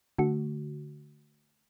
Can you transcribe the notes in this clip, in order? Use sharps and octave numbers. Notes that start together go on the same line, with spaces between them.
D3 A3 F#4